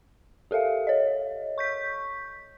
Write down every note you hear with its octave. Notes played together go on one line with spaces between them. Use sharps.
G4 A4 A#4 E5 F5
C#5 D#5
C#6 G6 B6